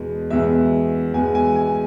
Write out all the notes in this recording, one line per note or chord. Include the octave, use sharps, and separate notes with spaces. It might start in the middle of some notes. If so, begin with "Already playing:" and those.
Already playing: E2 B2 G#3
E2 B2 G#3 E5
E2 B2 G#3 G#5
G#5
G#5